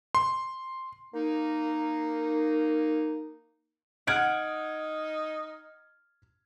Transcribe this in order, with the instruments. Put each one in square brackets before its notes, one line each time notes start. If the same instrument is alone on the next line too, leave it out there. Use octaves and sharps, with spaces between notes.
[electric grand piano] C6
[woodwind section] A#3 D#4
[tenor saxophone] D#4 [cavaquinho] F#5 [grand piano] F6 G#6 D7